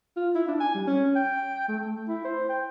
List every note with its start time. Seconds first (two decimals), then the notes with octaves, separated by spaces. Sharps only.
0.17 F4
0.35 E4
0.48 D4
0.60 G#5
0.75 G3
0.87 C#4
1.16 G5
1.68 A3
2.08 E4
2.25 C5
2.49 G5